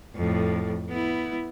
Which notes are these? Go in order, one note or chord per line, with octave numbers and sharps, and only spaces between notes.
F2 A2
B3 E4